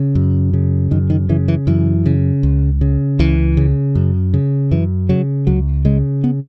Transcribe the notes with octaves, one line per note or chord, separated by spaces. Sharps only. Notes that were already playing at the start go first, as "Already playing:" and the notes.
Already playing: C#3
F#2
C#3
F#2 D#3
D#3
C#3 E3
E3
F#2 E3
C#3
C#2
C#3
C#2 E3
C#3
F#2
C#3
F#2 E3
C#3 F#3
C#2 F#3
C#3 G#3
B3